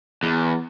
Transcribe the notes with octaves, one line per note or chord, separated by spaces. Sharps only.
E2